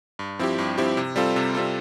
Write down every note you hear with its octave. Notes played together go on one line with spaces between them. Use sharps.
G2
F3 C4 E4 G4
G2
F3 C4 E4 G4
C3
G3 C4 F4 A4
C3
G3 C4 F4 A4